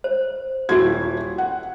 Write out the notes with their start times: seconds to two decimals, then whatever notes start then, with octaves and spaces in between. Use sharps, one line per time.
0.04 C5
0.69 D#1 E4 F#4 G4 G#6
1.38 F#5